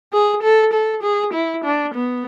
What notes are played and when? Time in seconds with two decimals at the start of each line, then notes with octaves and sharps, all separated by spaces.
0.13 G#4
0.43 A4
0.73 A4
1.03 G#4
1.34 E4
1.64 D4
1.94 B3